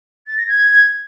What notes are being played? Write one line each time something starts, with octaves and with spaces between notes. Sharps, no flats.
A6
A#6
G#6